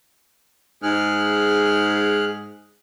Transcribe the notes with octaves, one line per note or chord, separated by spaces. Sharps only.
G#2 G#4 F6 F#6